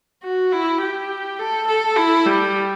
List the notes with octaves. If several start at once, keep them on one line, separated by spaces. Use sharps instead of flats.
F#4
E4
G4
A4
A4
E4
G3